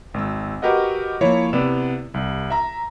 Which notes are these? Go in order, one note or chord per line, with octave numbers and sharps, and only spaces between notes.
G#1 E6
F#4 G4 A#4 B4 D#5 F#5
F3 A#3 E4 C#5
C3 B3 E4 D5 E7
C2
E5 A#5